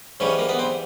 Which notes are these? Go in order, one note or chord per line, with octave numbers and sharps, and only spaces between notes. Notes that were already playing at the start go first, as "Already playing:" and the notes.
G#2 E3 G3 C#4
A#3
B3
C4